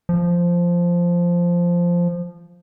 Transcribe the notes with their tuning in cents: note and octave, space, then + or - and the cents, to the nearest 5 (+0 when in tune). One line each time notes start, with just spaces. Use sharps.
F3 -5